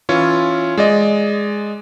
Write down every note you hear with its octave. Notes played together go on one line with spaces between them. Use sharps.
E3 C#4 F4 C#5
G#3 D5 D#5